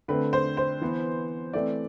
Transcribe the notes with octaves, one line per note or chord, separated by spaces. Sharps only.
D3 A3 C4 B4
C5
C5
E3 B3
E3 A3 C4 D5